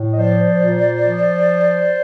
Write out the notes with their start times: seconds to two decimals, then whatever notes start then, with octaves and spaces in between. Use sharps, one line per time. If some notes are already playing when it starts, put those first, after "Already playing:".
Already playing: A2
0.13 D#5
0.17 F3 C5 D5
0.60 A#2
1.03 F3